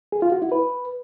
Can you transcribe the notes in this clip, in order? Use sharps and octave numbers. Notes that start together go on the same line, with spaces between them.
G#4
F4
F#4
E4
B4